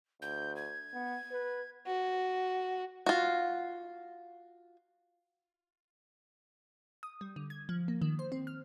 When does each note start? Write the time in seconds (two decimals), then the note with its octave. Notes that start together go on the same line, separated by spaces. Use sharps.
0.22 D2 G6
0.56 G#6
0.94 B3
1.32 B4
1.87 F#4
3.06 F4 F#4
7.03 D#6
7.21 G3
7.36 D3
7.50 G#6
7.69 F3
7.88 A#3
8.02 D#3
8.19 C5
8.32 C4
8.47 F6